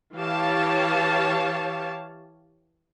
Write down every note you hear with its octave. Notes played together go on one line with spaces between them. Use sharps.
E3 G4 C#5 F5 A5